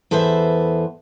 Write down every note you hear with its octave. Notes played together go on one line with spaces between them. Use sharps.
E2 A4 B4 C5 E5